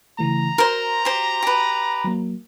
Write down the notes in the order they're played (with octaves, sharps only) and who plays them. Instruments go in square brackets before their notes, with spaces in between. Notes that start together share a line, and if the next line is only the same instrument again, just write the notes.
[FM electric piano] C#3 E3 A3 [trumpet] A#5
[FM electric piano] F#4 [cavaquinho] A#4 C5
[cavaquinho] G4 C5
G4 B4
[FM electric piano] F#3 A#3